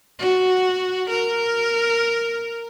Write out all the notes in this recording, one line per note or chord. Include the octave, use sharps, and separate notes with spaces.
F#4
A#4